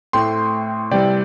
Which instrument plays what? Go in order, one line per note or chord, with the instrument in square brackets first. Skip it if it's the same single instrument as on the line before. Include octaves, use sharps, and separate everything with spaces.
[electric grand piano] A2 A3 C4 G5 C6
C3 E3 G3 C4 D5 G5